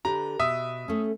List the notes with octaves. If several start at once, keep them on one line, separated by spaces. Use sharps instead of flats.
D3 G4 B4 A#5
B2 E5 D#6
A3 C#4